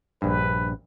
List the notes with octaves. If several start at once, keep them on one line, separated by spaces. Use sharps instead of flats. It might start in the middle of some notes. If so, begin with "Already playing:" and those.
A#1 G2 B4